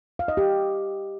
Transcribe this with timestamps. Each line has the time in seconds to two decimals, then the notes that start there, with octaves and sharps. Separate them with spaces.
0.19 F5
0.28 D#5
0.37 G4